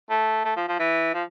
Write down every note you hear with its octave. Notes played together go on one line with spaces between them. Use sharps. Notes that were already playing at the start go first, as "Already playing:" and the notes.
A3
A3
F3
F3
E3
F3